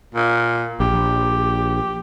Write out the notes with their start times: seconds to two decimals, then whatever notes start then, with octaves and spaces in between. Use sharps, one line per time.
0.14 A#2
0.80 A#1 G4